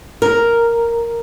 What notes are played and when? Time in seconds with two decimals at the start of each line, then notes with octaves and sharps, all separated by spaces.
0.22 A#4